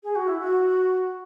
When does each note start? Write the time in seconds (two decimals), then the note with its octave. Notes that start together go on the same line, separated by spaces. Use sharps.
0.03 G#4
0.15 F#4
0.27 E4
0.39 F#4